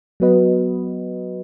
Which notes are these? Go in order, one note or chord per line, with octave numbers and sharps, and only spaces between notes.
F#3 B3 F#4 B4 D#5